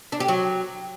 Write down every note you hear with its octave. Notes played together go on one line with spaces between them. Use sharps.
D4
G4
F#3